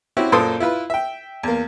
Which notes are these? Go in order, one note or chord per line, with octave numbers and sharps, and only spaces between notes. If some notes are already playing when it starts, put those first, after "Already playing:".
C4 C#4 E4 F#4 G4
F#2 A#2 A4 C5 C6 D#6
E4 F4 B4
E5 G5
E2 A#3